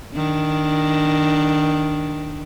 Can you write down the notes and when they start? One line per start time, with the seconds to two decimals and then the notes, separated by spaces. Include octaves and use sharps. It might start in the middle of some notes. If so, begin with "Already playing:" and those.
0.14 D#3 D4